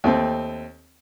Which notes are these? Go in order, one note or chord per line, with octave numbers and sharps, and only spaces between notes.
D#2 A3 C4